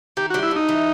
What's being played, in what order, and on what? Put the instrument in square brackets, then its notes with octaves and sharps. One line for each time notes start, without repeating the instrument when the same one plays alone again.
[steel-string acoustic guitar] D#3 [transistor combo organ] G4
[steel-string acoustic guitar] G3 [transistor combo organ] F#4
[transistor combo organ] E4
[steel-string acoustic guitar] G2 [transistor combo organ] D#4
[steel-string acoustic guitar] E3